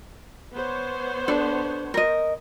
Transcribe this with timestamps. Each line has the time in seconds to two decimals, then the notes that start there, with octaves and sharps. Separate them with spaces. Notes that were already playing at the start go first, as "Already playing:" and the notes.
0.53 B3 C5 C#5
1.28 D4 A4
1.94 A#4 D#5